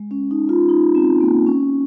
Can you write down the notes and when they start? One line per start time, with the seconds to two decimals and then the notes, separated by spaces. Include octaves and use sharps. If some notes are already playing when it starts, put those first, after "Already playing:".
Already playing: G#3
0.11 C#4
0.31 D#4
0.49 F4
0.69 D#4
0.95 C4
1.20 A#3
1.46 C#4